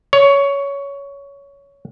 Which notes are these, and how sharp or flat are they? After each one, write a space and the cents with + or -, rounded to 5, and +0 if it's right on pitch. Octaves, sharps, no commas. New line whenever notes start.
C#5 +15